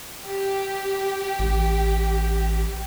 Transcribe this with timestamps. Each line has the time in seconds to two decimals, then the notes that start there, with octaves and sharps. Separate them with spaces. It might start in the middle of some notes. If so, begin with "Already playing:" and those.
0.26 G4
1.39 A1